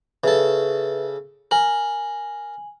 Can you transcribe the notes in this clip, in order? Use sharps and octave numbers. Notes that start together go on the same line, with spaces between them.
C#3 A4 B4 E5
A#4 G#5 F#7